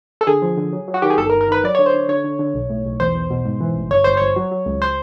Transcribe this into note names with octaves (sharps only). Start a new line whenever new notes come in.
A4
D3 G#4
F3
D3
F#3
F#3
F#4
D#3 G4
G#4
G1 A4
A#4
G1
A#4
D#3 B4
F#3 D5
C#5
D3
C5
D3
D3 C#5
D3
D3
B1
A2
B1
E2 C5
E2
B2
G#2
E3
A1
G1 C#5
G1 C5
G1 C#5
F#3
F#3
C#2
C5